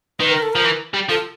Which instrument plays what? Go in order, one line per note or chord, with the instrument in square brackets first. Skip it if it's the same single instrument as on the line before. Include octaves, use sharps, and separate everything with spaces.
[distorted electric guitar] D#3 [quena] B4
[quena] A#4
A4
[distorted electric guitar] F3 [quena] A#4
[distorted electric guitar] E3
G3
[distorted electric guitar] F3 [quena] A4